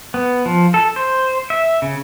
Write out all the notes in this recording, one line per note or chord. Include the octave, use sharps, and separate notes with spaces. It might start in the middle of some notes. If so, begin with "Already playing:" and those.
B3
F3
A4
C5
E5
C#3